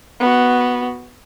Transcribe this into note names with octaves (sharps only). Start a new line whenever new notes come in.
B3 F#4